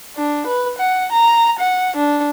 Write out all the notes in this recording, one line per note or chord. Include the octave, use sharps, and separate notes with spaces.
D4
B4
F#5
A#5
F#5
D4